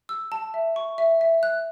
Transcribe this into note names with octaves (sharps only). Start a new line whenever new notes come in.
E6
A5
E5
C#6
E5
E5
F#6